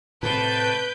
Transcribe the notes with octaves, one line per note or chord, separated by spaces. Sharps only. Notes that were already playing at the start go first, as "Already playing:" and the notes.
A2 C3 A3 A#4 B4 A5 G6 D7